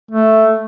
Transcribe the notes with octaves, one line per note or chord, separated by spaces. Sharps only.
A3